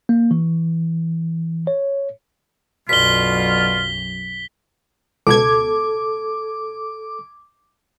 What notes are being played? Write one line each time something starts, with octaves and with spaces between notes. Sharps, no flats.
A#3
E3
C#5
B1 F#2 B2 D3 F4 B6 G7
C#2 B2 A4 D6 G#6